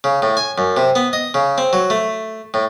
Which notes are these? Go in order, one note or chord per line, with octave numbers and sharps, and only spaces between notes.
C#3
A2
G#5
F#2
C3
B3
D#5
C#3
C4
F#3
A3
A2